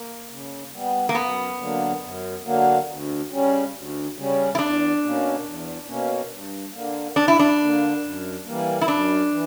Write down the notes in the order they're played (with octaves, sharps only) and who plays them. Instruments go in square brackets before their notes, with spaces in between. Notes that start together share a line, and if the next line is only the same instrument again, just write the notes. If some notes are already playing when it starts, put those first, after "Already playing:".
Already playing: [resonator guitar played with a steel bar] A#3
[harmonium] C#3
G3 B3
[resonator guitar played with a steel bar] A#3
[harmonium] F#2 [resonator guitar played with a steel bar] B3
[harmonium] D3 F#3 A#3
F#2
D3 F#3 A#3
D2
C#3 G3 C#4
D2
C#3 G3 C#4
[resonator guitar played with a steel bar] E4
[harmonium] E2 [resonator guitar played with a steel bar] D4
[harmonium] B2 A#3 C#4
E2
B2 A#3 C#4
G2
D3 A#3
[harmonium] G2 [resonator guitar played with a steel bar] D4
[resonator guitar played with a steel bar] E4
D4
[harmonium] D3 A#3
F#2
E3 G3 A#3
[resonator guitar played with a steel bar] E4
[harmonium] F#2 [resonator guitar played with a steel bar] D4
[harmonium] E3